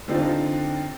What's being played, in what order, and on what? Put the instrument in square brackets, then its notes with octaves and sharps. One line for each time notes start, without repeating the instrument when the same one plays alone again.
[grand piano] D3 C4 D4 D#4 F4